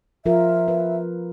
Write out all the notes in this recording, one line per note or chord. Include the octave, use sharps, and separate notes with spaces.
F3 F4 A#4 E5
B4